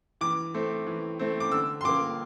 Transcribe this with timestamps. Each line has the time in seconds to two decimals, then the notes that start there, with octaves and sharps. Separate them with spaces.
0.21 E3 D6
0.54 A3 C4
0.87 E3
1.19 A3 C4
1.40 D6
1.52 D3 E6
1.81 C6
1.84 F3 A#3 D6